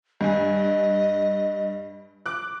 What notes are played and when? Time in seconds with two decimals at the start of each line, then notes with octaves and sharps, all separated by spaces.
0.21 G2 D#5 G#5
2.26 D6 F#6